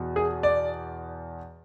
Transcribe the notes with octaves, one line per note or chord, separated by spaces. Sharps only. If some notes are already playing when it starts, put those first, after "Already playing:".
Already playing: E2 B2
G#4
D5